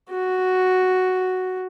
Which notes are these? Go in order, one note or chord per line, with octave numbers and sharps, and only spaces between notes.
F#4